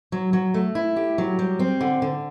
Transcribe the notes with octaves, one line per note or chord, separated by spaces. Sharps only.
F#3
F#3
A3
E4
G4
F#3
G3
C4
D3
D3